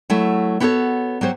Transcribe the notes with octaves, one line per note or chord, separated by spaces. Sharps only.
F#3 A3 E4
B3 E4 F#4 G4 A4 C#5
F#3 G4 C5 C#5